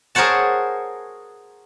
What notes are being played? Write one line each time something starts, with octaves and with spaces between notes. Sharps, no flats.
G#4 A#4 C5 C#5 F#5 A5